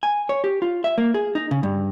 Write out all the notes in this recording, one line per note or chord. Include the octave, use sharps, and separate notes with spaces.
G#5
C#5
G4
F4
E5
A#3
G#4
D#4
C#3
G2